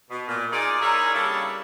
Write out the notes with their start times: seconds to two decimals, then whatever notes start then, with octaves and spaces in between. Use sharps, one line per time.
0.10 B2
0.28 A#2
0.53 D#4 F4 G#4 D5
0.82 D#4 E4 G#4 A#4 C#5 E5
1.13 C#3 G3 A#3 D4 E4 A4